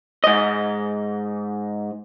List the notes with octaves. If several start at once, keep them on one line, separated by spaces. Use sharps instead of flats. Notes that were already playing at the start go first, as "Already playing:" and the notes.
G#2 D#5